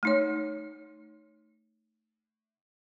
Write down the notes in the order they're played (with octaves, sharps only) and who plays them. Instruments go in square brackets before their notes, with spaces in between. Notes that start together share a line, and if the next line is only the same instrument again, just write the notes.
[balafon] A3 D#4 C#5